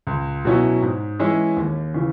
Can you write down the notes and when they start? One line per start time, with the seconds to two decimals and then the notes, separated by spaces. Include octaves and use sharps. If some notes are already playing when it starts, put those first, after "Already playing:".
0.07 C#2
0.45 B2 F#3 C#4 E4
0.82 G#2
1.19 E3 G#3 C#4 E4
1.57 D#2
1.94 C#3 E3